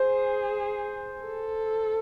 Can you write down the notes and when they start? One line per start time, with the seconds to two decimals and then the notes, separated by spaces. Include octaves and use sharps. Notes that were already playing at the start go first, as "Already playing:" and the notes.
Already playing: G#4 C5
1.22 A4